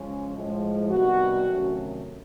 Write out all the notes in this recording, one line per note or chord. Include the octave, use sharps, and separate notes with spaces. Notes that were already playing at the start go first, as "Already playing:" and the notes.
Already playing: C#3 F3 G#3 C#4
A2 F3 G#3
C3 D#3 G3 B3 D4 F#4
C3 D#3 F#3 A3 C#4